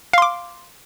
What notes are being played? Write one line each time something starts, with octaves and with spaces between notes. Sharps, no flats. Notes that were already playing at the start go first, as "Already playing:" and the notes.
F5 C6 D6